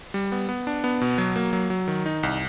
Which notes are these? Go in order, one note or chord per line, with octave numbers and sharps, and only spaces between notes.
G3
B3
B3
D4
B3
B2
F#3
A#3
F#3
F#3
D#3
D#4
C2